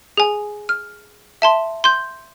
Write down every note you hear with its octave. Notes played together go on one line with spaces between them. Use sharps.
G#4 G#5
F6
E5 A5 C6
C6 G6